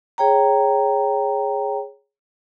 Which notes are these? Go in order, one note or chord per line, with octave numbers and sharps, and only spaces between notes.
G#4 C#5 G5 A#5